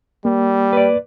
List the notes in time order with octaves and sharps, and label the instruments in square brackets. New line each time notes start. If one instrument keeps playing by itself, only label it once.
[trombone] G3 [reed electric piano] A#3
[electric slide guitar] B4 D5